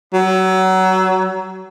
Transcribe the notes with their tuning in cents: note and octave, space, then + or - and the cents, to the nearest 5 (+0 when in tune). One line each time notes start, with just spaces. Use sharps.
F#3 +25